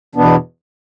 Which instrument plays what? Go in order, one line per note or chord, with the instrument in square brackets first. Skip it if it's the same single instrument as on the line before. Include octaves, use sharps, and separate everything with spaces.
[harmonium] E2 B2 B3 D4